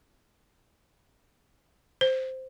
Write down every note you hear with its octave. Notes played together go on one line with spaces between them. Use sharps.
C5